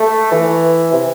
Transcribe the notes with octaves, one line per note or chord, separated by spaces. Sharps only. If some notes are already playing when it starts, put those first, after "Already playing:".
Already playing: A3
E3
C3